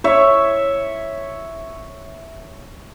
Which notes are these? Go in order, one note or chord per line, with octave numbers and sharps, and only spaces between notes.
C#5 E5